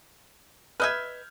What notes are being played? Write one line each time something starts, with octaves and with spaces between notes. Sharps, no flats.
B4 D#5 E5 F6 G6 G#6